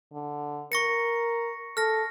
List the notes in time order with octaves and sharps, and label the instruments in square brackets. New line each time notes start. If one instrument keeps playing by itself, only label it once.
[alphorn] D3
[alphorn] A#4 [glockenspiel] C#6 A#6 C#7
[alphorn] A4 [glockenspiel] F6 A#6